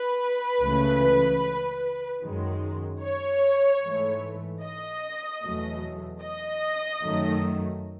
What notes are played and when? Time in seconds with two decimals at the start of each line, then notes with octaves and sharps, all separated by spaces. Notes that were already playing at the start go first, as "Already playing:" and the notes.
Already playing: B4
0.63 C#2 C#3 E3 A3
2.23 F#2 D#3 G#3
3.02 C#5
3.83 G#2 E3 A3
4.63 D#5
5.43 E2 B2 F#3 A3
6.22 D#5
7.02 F#2 D#3 F#3 A3